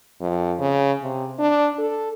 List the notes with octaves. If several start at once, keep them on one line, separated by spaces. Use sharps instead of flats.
F2
C#3
C3
D4
A4